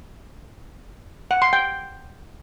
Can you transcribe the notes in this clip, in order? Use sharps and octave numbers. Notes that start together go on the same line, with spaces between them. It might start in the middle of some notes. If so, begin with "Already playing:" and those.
F#5
C6
G5